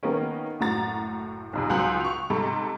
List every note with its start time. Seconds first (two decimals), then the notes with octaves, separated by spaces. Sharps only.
0.03 D#3 A#3 B3 C#4
0.60 F#1 A2 F#4 A#5 A6
1.53 B1 F2 C3
1.70 C#2 F#3 G#5 C6 F#6 F#7
2.01 C#6 F7
2.30 G#2 C3 A4 B5